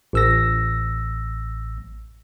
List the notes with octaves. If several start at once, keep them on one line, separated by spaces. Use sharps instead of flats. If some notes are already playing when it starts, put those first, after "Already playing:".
A1 E6 A#6